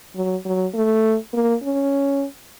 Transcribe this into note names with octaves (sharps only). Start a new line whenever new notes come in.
F#3
F#3
A3
A#3
C#4